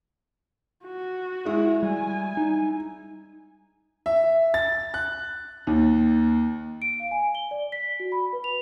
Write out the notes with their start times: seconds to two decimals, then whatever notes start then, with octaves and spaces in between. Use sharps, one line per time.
0.85 F#4
1.45 G#3 E4
1.83 G3 G#5
2.37 D#4
4.06 E5
4.54 A6
4.94 F#6
5.67 D#2
6.82 D7
7.00 F5
7.11 G#5
7.35 G7
7.51 D5
7.72 B6
8.00 F#4
8.12 B5
8.33 B4
8.44 F7